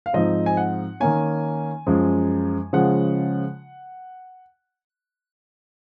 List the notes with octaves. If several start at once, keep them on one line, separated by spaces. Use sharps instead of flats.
F5
G#2 F3 C4 D#4 D#5
G#5
F#5
D#3 A#3 C#4 G#5
F#2 F3 G#3
C#3 F3 G#3 F#5